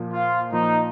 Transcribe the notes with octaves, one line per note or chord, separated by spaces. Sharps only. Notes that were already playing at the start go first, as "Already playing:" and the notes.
Already playing: A#2 F3 A#3
F4
A#2 F3 A#3 D#4